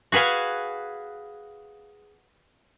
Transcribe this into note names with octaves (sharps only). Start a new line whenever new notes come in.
F#4 G#4 B4 F5 G#5